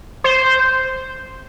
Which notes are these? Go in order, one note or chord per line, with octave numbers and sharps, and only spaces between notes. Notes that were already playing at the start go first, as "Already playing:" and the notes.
C5